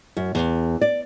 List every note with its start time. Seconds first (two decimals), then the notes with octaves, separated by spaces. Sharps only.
0.17 F#2
0.35 E2
0.81 D5